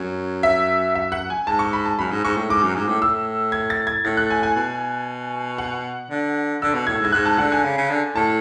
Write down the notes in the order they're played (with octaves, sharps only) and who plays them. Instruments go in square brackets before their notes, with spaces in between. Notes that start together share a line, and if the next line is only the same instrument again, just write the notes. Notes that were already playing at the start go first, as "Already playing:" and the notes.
Already playing: [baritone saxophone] F#2 [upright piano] C#5
[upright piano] E5
E5
F#5
G#5
[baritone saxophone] G#2 [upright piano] A5
[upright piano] C#6
B5
A5
[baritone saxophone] F#2 [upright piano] B5
[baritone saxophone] G#2
[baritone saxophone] G#2 [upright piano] C#6
[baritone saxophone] A2
[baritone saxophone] G#2 [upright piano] D6
[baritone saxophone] F#2
G#2
A2
[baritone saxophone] A2 [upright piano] E6
[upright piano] G#6
A6
G#6
[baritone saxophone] A2 [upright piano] A6
[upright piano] F#6
G#5
G#5
[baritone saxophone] B2
[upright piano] F#5
[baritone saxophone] D3
[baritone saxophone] D3 [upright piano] E6
[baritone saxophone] B2
[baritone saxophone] A2 [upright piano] G#6
[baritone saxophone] G#2
[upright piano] G#6
[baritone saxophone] G#2 [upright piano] F#6
[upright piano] A5
[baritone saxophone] D3 [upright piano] F#5
[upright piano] G#5
[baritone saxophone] C#3
C#3
D3
[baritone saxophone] A2 [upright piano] A5